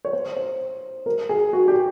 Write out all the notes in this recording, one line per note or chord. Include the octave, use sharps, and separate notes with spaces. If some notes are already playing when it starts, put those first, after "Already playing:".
C#5
C5
C5
A#4
G#4
F#4
G4